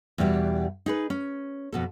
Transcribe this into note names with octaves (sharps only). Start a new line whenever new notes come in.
E2 B2 G3 G4
D#4 G#4 B4
C#4
F2 B2 A4